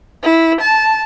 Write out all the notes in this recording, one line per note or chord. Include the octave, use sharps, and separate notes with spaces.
E4
A5